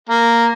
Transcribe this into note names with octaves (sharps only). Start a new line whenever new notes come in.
A#3